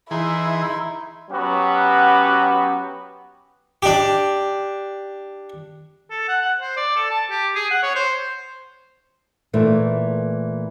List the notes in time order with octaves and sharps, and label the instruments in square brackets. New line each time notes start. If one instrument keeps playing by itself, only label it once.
[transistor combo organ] E3 G#4 [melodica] D#4 C6 [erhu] E4
[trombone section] F#3 B3 C#4 F#4 G4 B4
[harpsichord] D4 G4
[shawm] A4
F#5
F#5
C5
D5
A4
A5
G4
G#4
F#5
C#5
C5
[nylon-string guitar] A#2 E3 A3